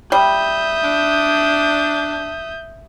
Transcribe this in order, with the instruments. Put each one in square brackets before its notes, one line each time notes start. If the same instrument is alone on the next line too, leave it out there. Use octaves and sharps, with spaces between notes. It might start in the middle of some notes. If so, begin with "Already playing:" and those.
[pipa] G3 [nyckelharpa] E5 D#6 [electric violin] G6
[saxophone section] D4